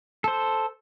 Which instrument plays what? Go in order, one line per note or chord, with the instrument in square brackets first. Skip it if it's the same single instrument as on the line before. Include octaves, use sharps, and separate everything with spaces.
[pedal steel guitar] A4 C5